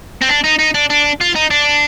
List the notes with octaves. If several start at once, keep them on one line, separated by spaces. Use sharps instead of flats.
C4
D4
D#4
D#4
D4
D4
F4
D#4
D4